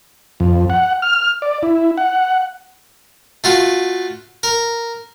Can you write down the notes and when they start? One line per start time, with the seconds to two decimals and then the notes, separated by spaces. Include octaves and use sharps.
0.40 F2
0.70 F#5
1.02 F6
1.42 D5
1.63 E4
1.98 F#5
3.44 A3 F4 F#4
4.43 A#4